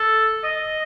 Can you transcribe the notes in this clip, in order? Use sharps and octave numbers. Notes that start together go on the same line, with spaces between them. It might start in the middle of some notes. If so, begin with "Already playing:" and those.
Already playing: A4
D#5